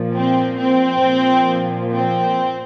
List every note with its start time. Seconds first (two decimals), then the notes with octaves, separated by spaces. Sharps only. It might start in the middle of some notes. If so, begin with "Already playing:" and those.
Already playing: A#2 F3
0.15 C4
0.59 C4
1.04 A#2 F3
1.94 C4